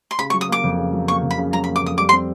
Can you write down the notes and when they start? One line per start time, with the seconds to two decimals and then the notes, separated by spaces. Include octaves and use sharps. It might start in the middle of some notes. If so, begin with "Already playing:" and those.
0.11 C6
0.19 C#3 B5
0.30 C#6
0.34 F#3
0.41 D#6
0.49 A#3 D6
0.64 F2
0.78 C#3
0.93 F#3
1.08 A#3 C#6
1.23 F2
1.31 B5
1.38 C#3
1.53 F#3 A#5
1.64 B5
1.68 A#3
1.76 D6
1.83 F2 D#6
1.98 G3 D6
2.09 C6
2.13 C4